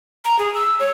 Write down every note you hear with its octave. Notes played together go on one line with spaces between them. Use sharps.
A#5
G#4
E6
C#5